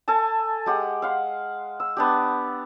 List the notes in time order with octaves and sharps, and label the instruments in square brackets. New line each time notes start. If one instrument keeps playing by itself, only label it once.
[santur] A4 G#5 A5
G#3 G4 F#5
F5 F#5 C6
E6
B3 D4 G4